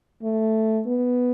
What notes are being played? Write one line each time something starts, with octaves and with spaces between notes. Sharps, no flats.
A3
B3